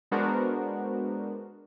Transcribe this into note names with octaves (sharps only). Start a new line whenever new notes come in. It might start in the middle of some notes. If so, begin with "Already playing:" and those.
G#3 B3 D4 F#4 A#4 C5